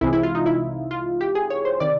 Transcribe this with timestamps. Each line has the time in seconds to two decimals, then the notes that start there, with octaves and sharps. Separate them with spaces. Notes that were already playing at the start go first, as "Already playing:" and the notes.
0.01 C2 C3 E3 G#3 E4
0.13 E4
0.23 F4
0.35 D#4
0.46 E4
0.91 F4
1.21 G4
1.35 G#4
1.50 C#5
1.65 C5
1.80 C3 D#3 D5